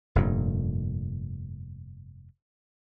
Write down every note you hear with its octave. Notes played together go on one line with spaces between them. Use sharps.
F1 G2 A#2